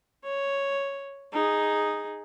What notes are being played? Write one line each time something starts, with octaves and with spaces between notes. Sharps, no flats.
C#5
D#4 G#4